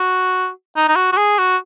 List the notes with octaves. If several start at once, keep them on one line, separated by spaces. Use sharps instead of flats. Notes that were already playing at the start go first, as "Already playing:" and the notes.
Already playing: F#4
D#4
D#4
F#4
F#4
G#4
F#4